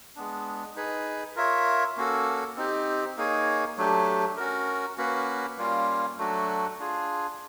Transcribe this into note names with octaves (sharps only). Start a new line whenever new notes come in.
G#3 B3 D4
D#4 G#4 B4
F4 A#4 C#5 E5
A#3 C#4 F#4 A4
C4 D#4 G4
A#3 D#4 G#4 C#5
F#3 A3 D4 G4
C#4 F#4 A#4
A#3 C#4 F#4 B4
G3 A#3 C#4 F4
F#3 A3 D4 F#4
D4 F4 G#4